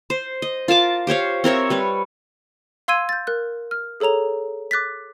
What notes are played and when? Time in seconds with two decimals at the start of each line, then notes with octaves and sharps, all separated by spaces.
0.10 C5
0.42 D#5
0.68 F4 A#4 A5 D6
1.07 G4 C5 C#5 F5
1.44 C4 A#4 C#5 E5
1.70 G3 B4 C#5
2.88 F5 C6 E6 G#6 D#7
3.09 G6 A6
3.27 A#4 F#6
3.71 F6
4.00 G#4 A4 C#5 A#5 F7
4.71 D6 F#6 A6 B6